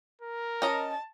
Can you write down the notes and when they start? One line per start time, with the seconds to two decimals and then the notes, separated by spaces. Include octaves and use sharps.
0.21 A#4
0.62 C#4 D#5 A5 A#5